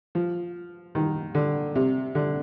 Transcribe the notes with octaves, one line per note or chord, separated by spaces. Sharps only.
F3
D#3
D3
C3
D3